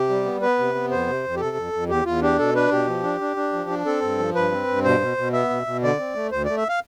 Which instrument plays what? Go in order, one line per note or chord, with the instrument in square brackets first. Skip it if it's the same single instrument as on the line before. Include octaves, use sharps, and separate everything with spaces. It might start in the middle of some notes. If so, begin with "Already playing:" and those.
Already playing: [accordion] C3 G4
G3
B3
B3 B4
C3
B3
F2 C5
C3
F2
G4
C3 A4
F2
F2
E2 G4
E2 F4
D4 G4
B2 A4
D4 B4
B2 G4
F3
D4
D4
D4
F3
D4
C4 A4
G2
F3
G2 B4
C4
G2
B2 C5
B2
B2
B3 E5
B2
B2
D3 D5
C4
A3
D2 C5
A3 D5
E5
F5